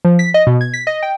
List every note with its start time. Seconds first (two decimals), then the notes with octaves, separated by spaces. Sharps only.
0.05 F3
0.19 B6
0.34 D#5
0.47 B2
0.61 G#6
0.74 B6
0.87 D#5
1.03 G5